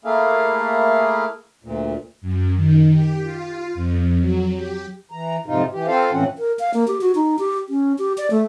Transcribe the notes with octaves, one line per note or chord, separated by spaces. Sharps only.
A3 A#3 E4 G#4 F5
D2 A#2
F#2
D#3
G4
F4
F2
F#3
G4
E3 A#5
F2 G#2 C3 D#4 F4
E3 G4
C4 F4 A4 C5 F5
A2 E3 F3 C4 C#4 F#5
A#4
F5
A#3
G4
F#4
D#4
G4
C#4
G4
D5
A3